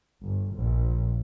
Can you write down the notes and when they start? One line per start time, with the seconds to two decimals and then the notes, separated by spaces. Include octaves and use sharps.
0.22 G1
0.57 A#1